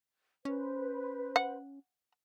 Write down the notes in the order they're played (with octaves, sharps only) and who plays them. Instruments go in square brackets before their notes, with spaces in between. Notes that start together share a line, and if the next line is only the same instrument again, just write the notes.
[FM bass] C#4 [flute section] B4 C5
[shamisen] F#5